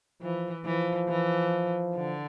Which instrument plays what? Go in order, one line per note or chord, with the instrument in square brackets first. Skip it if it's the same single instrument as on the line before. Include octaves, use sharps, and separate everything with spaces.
[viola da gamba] E3 [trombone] F3
[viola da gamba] E3 [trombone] F3
[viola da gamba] E3
D3